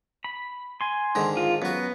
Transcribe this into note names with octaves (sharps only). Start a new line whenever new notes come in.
B5
G#5 C6
G#2 D3 D#3
F4
F#2 B3 F#4